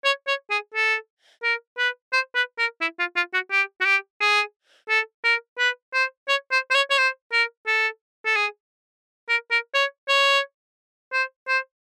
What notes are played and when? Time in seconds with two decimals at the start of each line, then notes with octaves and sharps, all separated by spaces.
0.05 C#5
0.27 C#5
0.51 G#4
0.74 A4
1.43 A#4
1.78 B4
2.13 C5
2.35 B4
2.59 A#4
2.81 E4
2.99 F4
3.16 F4
3.34 F#4
3.51 G4
3.81 F#4
3.86 G4
4.20 G#4
4.89 A4
5.24 A#4
5.59 B4
5.94 C5
6.28 C#5
6.52 C5
6.71 C5
6.75 C#5
6.90 C#5
6.98 C5
7.32 A#4
7.67 A4
8.26 A4
8.36 G#4
9.29 A#4
9.51 A#4
9.74 C#5
10.09 C#5
11.13 C5
11.48 C5